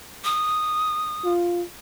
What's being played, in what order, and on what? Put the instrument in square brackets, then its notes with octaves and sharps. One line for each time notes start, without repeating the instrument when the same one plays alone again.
[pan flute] D#6
[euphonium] F4